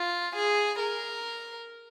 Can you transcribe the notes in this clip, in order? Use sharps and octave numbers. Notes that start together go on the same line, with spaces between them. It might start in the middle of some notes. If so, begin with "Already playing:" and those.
Already playing: F4
G#4
A#4